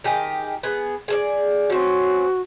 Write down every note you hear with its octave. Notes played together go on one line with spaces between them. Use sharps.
D#3 G4 G#4
B3 G#4
G#4 A4 D5
C4 C#4 F#4